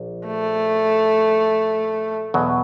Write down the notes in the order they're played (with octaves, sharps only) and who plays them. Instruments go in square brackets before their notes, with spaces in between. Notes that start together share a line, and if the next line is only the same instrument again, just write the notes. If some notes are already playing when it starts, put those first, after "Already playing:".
Already playing: [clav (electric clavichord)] A#1
[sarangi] A3
[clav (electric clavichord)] E2 B2 F#3